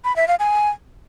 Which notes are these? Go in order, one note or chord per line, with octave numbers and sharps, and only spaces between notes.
B5
E5
F5
G#5